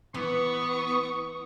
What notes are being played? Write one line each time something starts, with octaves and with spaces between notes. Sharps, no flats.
E3 B3 C#6 D#6